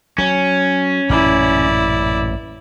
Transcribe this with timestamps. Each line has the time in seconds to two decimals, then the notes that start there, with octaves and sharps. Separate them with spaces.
0.18 F#3 C#4
1.10 A1 F#2 A#2 E4 D5